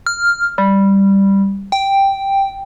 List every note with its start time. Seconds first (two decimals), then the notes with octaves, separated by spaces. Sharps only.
0.07 F6
0.58 G3
1.72 G5